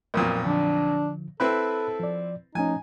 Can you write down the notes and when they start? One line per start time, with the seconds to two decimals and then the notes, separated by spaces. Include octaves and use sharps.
0.14 B1 F2 A#2 A#4 D#6
0.45 D3 F3 D4
1.40 C4 E4 A4 B4 B5 F#6
2.00 F3 D5
2.55 F3 A3 C#4 D#4 G#5